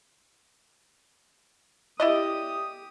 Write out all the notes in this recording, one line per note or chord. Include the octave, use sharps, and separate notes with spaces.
E4 G4 D5 D#5 D#6